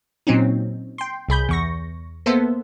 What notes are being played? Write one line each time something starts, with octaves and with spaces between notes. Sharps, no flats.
A#2 F#3 C4 C#4 D#4
G5 C6
C2 G#4 B5 G6
E2 C#6 A#6
A#3 B3 A4 C5 E5